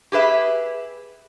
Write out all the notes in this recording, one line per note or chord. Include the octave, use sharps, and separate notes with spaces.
G4 G#4 B4 E5